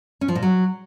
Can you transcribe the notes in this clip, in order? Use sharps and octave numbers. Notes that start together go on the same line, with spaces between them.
C#4
F3
A#2
F#3